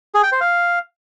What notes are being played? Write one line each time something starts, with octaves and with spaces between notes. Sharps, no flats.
G#4
G5
C5
F5